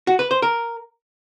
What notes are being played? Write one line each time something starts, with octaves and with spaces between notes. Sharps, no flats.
F#4
B4
C5
A#4